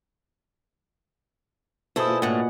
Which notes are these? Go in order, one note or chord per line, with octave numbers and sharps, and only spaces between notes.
B2 E4 G#4 A4 B4 C5 D#5 D#6
A#2 F#4
A2 D3 F#5